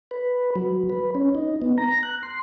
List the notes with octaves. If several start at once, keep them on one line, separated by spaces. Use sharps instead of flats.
B4
F#3
B4
C#4
D#4
B3
A#5
F#6
C6